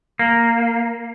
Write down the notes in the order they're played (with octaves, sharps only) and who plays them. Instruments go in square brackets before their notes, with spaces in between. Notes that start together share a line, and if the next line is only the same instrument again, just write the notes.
[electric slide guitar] A#3